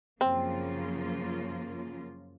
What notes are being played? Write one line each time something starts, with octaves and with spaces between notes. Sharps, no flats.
F#2 C#3 F3 A#3 C4 F4